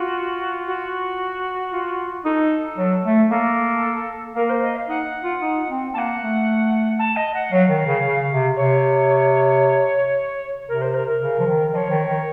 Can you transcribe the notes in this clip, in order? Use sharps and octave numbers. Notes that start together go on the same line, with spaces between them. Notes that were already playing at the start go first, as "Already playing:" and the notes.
Already playing: F4 F#4
F#4
F4
D#4 A4
F#3
A3
A#3 A4
A#3 A#4
C5
D#5
F5
D#4 F#5
F4
D#4
C4
A#3 F#5 A5
A3
A5
D#5
F#5
F#3 F5
D#3
C#3
C#3
C3
C3 C#5
C3 A#4
C5
A#4
A#4
C#3
F3
D#3
F3 C#5 D#5
D#3
D#3